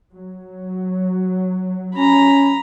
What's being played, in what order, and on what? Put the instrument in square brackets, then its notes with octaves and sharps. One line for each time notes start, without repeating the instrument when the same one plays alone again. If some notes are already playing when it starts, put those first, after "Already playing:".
[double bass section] F#3
[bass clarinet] C#4 [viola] A#5 B5